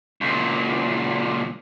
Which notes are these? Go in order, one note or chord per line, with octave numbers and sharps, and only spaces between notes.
C#2 A#2